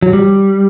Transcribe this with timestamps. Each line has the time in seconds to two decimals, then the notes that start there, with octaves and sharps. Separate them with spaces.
0.02 F#3
0.13 G3